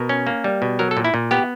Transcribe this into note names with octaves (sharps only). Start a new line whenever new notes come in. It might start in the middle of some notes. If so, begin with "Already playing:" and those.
Already playing: B2 A#4
C#4
A#3
G3
B2
F#3 A#4
A4
A#2
E4
A#2
B3 G4